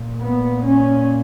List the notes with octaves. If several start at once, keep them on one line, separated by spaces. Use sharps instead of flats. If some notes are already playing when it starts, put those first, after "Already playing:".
Already playing: A#2
B3
C#4